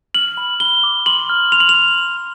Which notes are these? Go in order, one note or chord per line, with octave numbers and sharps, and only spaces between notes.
F6 F#7
B5
B5 G7
D6
C6 F#7
F6
C6 F7
F#7
F7
F6